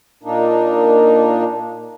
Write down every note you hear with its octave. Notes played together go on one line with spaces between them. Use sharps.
A#2 A#3 D4 D#4